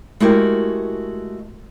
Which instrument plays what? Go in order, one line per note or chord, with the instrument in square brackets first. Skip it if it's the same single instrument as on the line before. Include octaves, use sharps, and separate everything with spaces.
[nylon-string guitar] G#3 A3 E4 F#4 G4 A#4